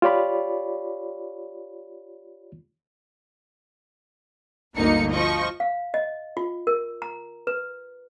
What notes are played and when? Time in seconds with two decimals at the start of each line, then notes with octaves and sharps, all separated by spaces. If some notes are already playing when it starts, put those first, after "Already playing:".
0.02 F4 G4 C#5 D5 B5
4.74 G1 D2 A#3 D#4 C#7
5.12 F3 D#5 C#6
5.60 F5
5.94 D#5
6.37 F4
6.67 A#4
7.02 A#5
7.47 B4